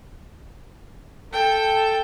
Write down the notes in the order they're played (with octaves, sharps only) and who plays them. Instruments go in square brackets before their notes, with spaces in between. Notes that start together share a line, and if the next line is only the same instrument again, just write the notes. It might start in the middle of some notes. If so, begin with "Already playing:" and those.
[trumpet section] A4 [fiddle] G5